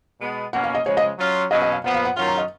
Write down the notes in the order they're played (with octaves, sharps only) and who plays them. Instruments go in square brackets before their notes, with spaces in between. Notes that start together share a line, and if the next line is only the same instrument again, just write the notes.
[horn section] B2 G#3 B3
[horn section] B2 A#3 C#4 [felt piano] F#5
[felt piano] F5
D#5
[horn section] C#3 F3 G#3 [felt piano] C#5
[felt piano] D#5
[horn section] F#3 C#4 F4
[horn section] B2 F#3 C#4 [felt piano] D#5
[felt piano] D#5
F5
[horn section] A#2 F3 B3 [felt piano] F#5
[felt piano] F5
F#5
[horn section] D#3 F#3 C#4 F4 [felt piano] F#5
[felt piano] A#5
D#5